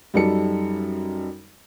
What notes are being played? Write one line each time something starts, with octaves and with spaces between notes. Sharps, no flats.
F#2 G3 D#4 A4 C#7